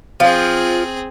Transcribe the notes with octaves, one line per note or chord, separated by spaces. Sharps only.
F3 C4 G#4 F5